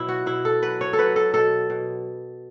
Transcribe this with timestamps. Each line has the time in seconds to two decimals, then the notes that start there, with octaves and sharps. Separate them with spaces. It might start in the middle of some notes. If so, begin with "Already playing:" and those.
Already playing: B2 F#3 E4
0.09 F#4
0.26 B2 E4
0.45 A4
0.62 F#3 B4
0.81 C#5
0.93 A4
0.98 F#3 B4
1.16 A4
1.34 B2 A4
1.70 B2